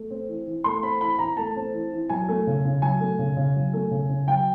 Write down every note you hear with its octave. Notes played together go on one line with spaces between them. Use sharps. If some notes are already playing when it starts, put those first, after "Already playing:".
Already playing: A3
C4
E3
E3
A3 C6
C4 B5
E3 B5
E3 A#5
A3 A5
C4
E3
E3
F#3 G#5
A3
C#3
C#3
F#3 G#5
A3
C#3
C#3
F#3
A3
C#3
C#3
F#3 G5